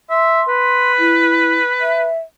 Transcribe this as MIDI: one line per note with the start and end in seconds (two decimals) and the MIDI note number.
0.10 0.41 76
0.10 0.92 84
0.48 2.10 71
0.99 1.58 64
1.81 2.18 76